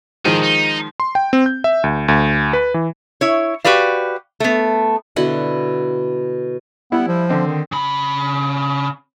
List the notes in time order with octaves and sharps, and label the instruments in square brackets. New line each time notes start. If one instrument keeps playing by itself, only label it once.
[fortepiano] D#3 F3 G#3 [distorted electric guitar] D#4 G#4
[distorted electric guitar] D#4
[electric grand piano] C6
G5
C4
G6
E5
D2
D2
B4
E3
[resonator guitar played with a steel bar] E4 C#5
F#4 G4 B4 D5 F5
A3 B3
[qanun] B2 D3 E4 F#5
[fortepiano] G3 E4 [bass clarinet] B3
[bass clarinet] F3
[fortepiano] D3 C4
[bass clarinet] D#3
[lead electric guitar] C#3 B5